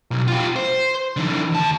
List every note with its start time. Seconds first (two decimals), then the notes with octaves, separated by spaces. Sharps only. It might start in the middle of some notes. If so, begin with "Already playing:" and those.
0.11 B1
0.28 F4 G4
0.56 C5
1.17 D3 E3
1.52 D#2 A5